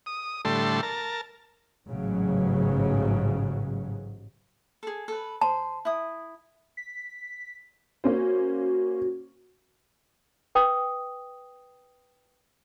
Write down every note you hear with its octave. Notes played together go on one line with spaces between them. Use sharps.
D#6
A2 D3 G3 A3 A5 C6
A#4 A5
A1 G#2 C#3 F#3
G#4 A4
A4 B4
C5 A5
E4 D#6
B6
A#3 C#4 F#4 C5
B4 G5 D#6